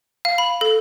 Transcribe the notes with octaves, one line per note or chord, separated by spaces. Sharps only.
F5
B5
A4